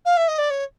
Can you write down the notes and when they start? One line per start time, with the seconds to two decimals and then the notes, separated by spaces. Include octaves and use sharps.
0.05 F5
0.17 E5
0.28 D#5
0.38 D5
0.50 C#5